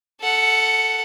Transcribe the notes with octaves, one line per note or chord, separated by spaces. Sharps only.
A4 F#5